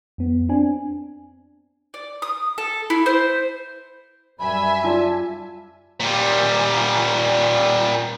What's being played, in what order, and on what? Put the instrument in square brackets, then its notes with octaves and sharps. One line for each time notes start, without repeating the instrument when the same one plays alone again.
[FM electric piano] F2 B3
C4 D4 G#5
[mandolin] D5
D#6
A4
E4
C5
[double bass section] F#2 G3 [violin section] E5 G#5 [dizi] B5
[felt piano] F4 D5 [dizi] A5
[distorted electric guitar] A#2 G3